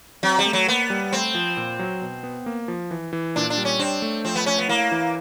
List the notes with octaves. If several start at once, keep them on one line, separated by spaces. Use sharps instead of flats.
F#3 C4
G3
A3
F#3
A#3 B3
G3
A3 C4
F3
A#2
F#3
B2
B3
A#3
F3
E3
E3
A#2 D4
D4
G3
C#4
C4 D4
A3
F3 C4
B3
A3 C#4
B3
A#3 E4
E3